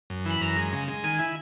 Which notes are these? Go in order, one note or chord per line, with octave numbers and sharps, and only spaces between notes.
F#2
E3 B5
F#2 A#5
G#3
C#3
G#3
D#3 G#5
E4